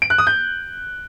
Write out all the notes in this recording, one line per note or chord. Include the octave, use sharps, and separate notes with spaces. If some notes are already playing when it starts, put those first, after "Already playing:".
D7
F#6
D#6
G6